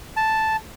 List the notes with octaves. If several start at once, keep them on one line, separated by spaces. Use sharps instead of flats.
A5